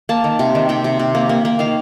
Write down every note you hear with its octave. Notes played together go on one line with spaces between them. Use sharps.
A#3 A5
D#3
C3
D#3
C3 G5
C3
C3
A#3
A#3
A#3
D#3 F5